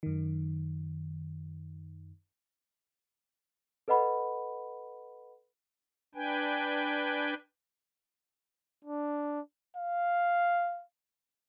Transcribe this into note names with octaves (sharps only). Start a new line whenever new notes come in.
F#2 D#3
A4 B4 D#5 F#5 B5
D4 B4 G5 G#5
D4
F5